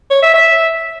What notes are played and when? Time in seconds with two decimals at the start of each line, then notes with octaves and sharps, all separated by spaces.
0.10 C#5
0.22 E5
0.34 E5